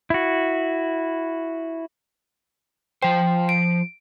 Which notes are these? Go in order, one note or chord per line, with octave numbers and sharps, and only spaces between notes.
E4 F#4
F3 C5 G5
D7